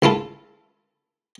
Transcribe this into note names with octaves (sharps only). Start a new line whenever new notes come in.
C#2 E4 F4 A4